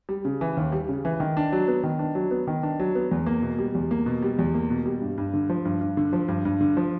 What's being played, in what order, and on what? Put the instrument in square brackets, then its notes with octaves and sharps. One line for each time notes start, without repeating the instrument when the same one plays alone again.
[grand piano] G3
C#3
E3
D#2
G3
C#3
E3
D#3
D4
F#3
B3
D#3
D4
F#3
B3
D#3
D4
F#3
B3
E2
A#3
B2
G3
E2
A#3
B2
G3
E2
A#3
B2
G3
G2
G2
D3
F3
G2
G2
D3
F3
G2
G2
D3
F3